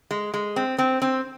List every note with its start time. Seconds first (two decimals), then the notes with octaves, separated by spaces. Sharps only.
0.11 G#3
0.34 G#3
0.56 C4
0.78 C4
1.02 C4